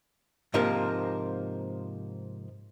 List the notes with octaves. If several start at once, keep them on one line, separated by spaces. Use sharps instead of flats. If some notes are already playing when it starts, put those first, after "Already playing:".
G#2 C3 F3 A#3 A#4